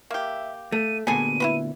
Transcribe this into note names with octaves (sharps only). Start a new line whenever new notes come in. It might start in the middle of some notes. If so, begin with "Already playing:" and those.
A#3 G4 E5
A3 D#7
D2 A#2 B3 G#4 A4 G#5 D#7
E4 F#4 B4